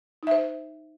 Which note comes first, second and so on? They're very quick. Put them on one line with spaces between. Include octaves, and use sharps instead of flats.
D#4 E5 C5